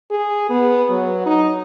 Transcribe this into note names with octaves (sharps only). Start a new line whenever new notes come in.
G#4
B3
F#3
D#4